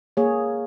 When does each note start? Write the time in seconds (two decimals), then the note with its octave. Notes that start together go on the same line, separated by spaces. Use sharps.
0.17 A#3 G#4 C#5